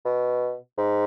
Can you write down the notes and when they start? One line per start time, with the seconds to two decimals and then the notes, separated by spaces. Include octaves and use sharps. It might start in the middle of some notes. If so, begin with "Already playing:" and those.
0.06 B2
0.78 G#2